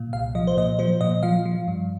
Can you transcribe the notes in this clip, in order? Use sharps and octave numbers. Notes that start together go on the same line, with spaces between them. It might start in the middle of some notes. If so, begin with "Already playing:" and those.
Already playing: A#2
C2 F5
F3 D#5
C5
A#2 D#5
F3 C5
A#2 D#5
F3 F5
F3
G2